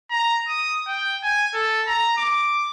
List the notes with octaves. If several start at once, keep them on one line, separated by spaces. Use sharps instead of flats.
A#5
D#6
G5
G#5
A4
A#5
D6